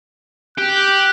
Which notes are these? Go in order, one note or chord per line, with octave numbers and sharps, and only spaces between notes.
G4 F#6